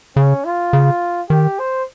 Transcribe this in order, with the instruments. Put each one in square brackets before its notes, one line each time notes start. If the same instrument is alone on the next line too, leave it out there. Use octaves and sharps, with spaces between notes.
[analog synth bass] C#3 [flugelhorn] C#4
[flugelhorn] F4
[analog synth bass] C#3
[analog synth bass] D#3 [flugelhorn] G4
[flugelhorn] C5